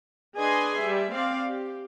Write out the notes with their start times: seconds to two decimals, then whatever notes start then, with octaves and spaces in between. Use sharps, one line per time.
0.36 D4 G#4 B4 D#5 G#5 C6
0.79 G3 E5
1.11 C4 D5 F5
1.45 G4